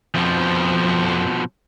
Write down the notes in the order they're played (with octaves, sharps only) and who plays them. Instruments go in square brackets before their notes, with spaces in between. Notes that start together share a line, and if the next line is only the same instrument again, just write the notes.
[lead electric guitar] F2 [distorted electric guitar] B2 F3